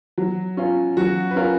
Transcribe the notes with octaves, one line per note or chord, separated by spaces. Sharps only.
F#3
C#4 F4
F#3 F#4
B4
C#4 F4 A#4